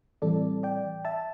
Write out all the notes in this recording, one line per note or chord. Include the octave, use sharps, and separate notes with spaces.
A2 E3 G3 C4 A4 D5
D5 G5
E5 A5